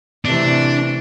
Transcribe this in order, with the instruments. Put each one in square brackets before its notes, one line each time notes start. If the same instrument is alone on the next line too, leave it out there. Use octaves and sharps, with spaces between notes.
[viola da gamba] C3 E3 A3 [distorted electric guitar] D4